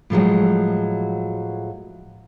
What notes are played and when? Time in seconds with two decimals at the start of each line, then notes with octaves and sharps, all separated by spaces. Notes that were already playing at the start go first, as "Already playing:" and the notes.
0.10 A2 F3 F#3 G#3